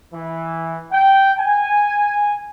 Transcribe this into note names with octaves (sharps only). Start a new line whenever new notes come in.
E3
G5
G#5